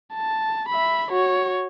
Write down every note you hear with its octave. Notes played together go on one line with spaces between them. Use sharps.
A5
E5 B5
F#4 C#5